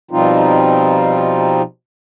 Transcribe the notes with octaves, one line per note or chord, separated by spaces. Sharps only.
B2 F3 G3 C4 D#4 F4